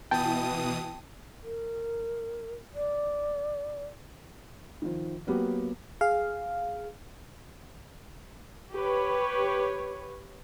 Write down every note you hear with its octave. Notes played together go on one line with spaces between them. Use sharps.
B2 E3 G5 A5 D#6
A#4
D5
D#3 F3
F#3 A#3 B3 F#4 G4
G#4 F5
G4 B4 C#5